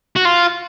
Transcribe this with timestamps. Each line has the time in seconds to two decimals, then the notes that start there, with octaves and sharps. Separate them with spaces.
0.16 F#4
0.25 F4